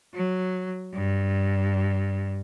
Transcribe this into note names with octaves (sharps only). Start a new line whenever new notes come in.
F#3
G2